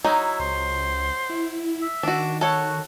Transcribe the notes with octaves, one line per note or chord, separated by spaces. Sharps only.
F#3 D#4 E4
C#2 C5
E4
E5
D#3 D4 F#4
F#4 A4 C#5 F#5